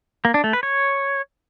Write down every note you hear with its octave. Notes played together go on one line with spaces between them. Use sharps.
A#3
D4
A3
B4
C#5